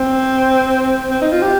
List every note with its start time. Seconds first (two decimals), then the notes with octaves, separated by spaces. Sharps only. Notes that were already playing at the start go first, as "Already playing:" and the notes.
Already playing: C4
1.11 C4
1.22 D#4
1.32 F4
1.42 G4